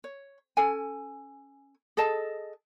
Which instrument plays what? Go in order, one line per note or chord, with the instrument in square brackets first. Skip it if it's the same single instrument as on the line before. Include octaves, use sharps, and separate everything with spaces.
[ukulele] C#5
C#4 A4 G#5
G#4 A4 D#5 A5